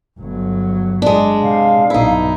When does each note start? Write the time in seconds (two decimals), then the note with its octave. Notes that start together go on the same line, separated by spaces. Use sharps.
0.19 G1 F#3
1.02 G#3 D4
1.42 C3 F5
1.90 B1 G2 D#4 E4